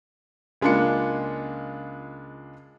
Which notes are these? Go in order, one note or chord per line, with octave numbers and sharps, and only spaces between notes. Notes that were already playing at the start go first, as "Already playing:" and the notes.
C#2 G#3 A#3 D4 F4 C#7